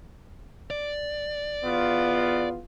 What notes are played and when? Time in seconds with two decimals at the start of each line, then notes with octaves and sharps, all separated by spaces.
0.70 D5
1.64 E2 B3 F4